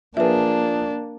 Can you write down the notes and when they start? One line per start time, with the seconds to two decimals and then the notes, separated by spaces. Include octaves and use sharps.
0.17 F3 A#3 D4 G#4 B4 E5